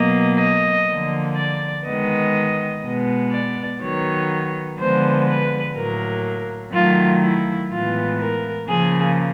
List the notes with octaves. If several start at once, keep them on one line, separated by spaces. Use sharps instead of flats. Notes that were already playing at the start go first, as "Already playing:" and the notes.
Already playing: B2 F#3 A#3 D#5
D#5
D3 F3 A#3
D5
D#3 G#3 B3 D#5
B2 G#3 B3
D5
D#3 F#3 B3 C#5
D3 F3 G#3 B3 C5
B4
A2 F#3 A#3 A#4
D#3 F#3 A3 F4
E4
A2 E3 G#3 B3 F4
A#4
C#3 F3 A#3 G#4